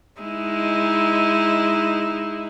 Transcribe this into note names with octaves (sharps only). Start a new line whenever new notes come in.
G#3 D#4 E4